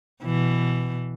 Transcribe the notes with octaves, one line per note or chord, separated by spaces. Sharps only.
B2 E3